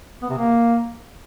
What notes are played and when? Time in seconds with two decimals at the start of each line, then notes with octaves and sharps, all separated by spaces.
0.22 B3
0.30 C3
0.38 A#3